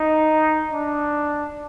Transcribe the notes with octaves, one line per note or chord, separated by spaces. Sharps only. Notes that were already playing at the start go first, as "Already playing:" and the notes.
Already playing: D#4
D4